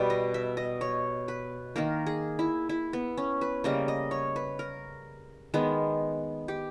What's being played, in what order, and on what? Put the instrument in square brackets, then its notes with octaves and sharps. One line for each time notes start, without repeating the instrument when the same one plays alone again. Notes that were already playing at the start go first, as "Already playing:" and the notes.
Already playing: [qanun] B2 G3 B3
D#5
E5
D#5
C#5
B4
D#3 A#3 A#4
G#4
E4
E4
B3
C#4
B4
C#3 G3 A#3 D#5
D#5
C#5
B4
A#4
D#3 G#3 B3
G4